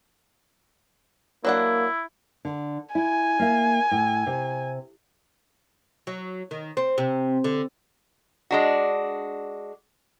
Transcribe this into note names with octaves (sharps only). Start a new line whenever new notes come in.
F#3 A#3 D4 E4 F#5
D3
E4 G#5
A#3 E5
A2
C3
F#3
D#3
C4
C3
D3
G#3 D4 F#4